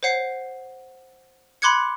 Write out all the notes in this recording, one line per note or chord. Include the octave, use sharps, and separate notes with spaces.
C5 C#5 F#5 C7
B5 C6 D6 F#6 G#6 C#7